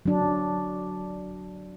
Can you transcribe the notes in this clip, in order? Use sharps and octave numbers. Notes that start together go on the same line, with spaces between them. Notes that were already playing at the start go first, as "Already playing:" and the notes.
F#3 D4